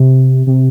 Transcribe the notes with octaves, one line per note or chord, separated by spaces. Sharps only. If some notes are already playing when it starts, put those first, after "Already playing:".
Already playing: C3
C3